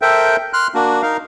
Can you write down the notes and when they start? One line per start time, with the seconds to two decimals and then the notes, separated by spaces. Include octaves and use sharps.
0.02 A4 A#4 C5 E5 G5
0.53 C6 F6 F#6
0.74 A#3 D4 F#4
1.02 D#4 A#4 F5